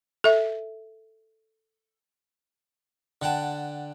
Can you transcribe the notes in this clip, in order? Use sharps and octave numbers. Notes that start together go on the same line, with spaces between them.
A4 E5
D3 F#5 G5 A5